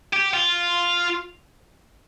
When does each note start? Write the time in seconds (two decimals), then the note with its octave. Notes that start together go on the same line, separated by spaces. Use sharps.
0.13 G4
0.34 F4